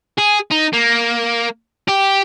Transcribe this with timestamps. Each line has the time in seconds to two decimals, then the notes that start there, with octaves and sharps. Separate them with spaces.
0.18 G#4
0.51 D#4
0.73 A#3
1.88 G4